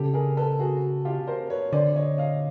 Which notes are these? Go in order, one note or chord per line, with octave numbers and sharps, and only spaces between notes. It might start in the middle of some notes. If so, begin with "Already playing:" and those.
Already playing: C#3 G4 A4
G#4 A#4
A4 B4
F#4 G#4
F4 G4
A#4 C5
B4 C#5
D3 C5 D5
C#5 D#5
D#5 F5